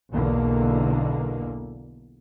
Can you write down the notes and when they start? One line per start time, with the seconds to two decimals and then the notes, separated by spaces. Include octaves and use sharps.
0.10 B1 E2 B2 D3 A#3